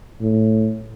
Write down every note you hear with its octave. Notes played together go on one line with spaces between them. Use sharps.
A2